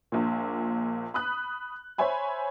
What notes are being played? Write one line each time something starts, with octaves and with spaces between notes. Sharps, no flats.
A#1 A#2
B5 D#6 F#6
C5 C#5 E5 G#5 B5